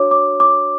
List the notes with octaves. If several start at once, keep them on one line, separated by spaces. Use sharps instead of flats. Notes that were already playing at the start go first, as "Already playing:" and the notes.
Already playing: D4 F#4 C#5 D6
D6
D6